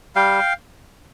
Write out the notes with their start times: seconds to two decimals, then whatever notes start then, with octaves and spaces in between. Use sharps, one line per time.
0.16 G3 F5 G5